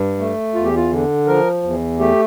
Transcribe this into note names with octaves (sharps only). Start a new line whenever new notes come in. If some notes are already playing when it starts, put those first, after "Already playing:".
Already playing: G2
A3
E2 F4
G4
F4
D3
F3 A#4
E2
A3 G4